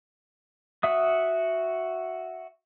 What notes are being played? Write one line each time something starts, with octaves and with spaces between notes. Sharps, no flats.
F#4 E5 D#6